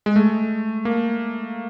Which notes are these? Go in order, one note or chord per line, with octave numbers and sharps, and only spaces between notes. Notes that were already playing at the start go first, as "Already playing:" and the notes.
G#3
A3
A#3